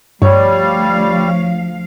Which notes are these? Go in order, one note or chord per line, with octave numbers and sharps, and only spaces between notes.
D2 G2 F3 G3 C#5 F5